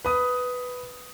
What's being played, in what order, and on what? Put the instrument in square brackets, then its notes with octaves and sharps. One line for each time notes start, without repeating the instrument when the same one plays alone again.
[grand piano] B4 D#6